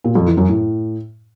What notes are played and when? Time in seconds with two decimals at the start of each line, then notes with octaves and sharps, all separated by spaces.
0.04 A#2
0.15 F2
0.26 E3
0.37 F#2
0.48 A2